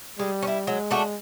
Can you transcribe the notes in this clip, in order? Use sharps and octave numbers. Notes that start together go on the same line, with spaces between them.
G3 G#3
C#4
E4
F#3 G#3
A3 D4 F#4